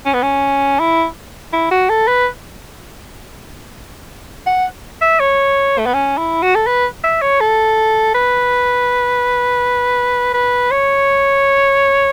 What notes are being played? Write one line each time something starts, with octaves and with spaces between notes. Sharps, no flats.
C#4
B3
C#4
E4
E4
F#4
A4
B4
F#5
E5
C#5
A3
B3
C#4
E4
F#4
A4
B4
E5
C#5
A4
B4
B4
C#5